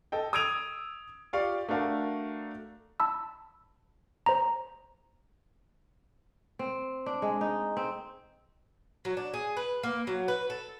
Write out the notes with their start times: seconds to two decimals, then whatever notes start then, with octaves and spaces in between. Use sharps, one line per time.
0.12 A4 D#5 G5
0.33 D#6 E6 G#6 D7 D#7 F7
1.33 F4 G4 D5 F5 C#6
1.69 A3 D4 F#4 A4 A#4 F5
3.00 A5 B5 E6
4.26 C5 A#5
6.59 C4
7.06 D4
7.22 G#3
7.41 D#4
7.77 C4
9.05 F#3
9.17 D4
9.34 G#4
9.57 B4
9.83 A#3
10.07 F#3
10.28 B4
10.50 A4